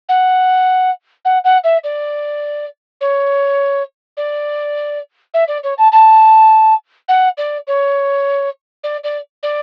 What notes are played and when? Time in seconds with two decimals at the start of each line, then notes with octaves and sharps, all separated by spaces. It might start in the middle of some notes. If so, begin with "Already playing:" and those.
0.08 F#5
1.25 F#5
1.44 F#5
1.64 E5
1.83 D5
3.00 C#5
4.17 D5
5.34 E5
5.48 D5
5.63 C#5
5.78 A5
5.92 A5
7.08 F#5
7.37 D5
7.67 C#5
8.83 D5
9.04 D5
9.43 D5